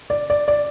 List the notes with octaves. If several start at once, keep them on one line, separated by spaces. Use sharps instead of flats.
D5
D5
D5